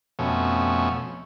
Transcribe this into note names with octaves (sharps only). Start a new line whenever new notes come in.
F2 B2 A3 C#4